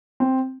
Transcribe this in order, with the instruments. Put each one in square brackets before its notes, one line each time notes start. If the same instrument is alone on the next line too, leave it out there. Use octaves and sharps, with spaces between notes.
[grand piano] C4